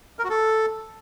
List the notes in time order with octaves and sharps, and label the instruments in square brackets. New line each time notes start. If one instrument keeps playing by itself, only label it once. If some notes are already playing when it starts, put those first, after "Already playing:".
[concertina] A#4
F#4
A4